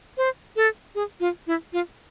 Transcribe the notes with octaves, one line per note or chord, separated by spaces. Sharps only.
C5
A4
G#4
F4
E4
F4